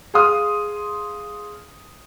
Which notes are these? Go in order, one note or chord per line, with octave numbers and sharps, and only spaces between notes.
G#4 F5 C6 D#6 F6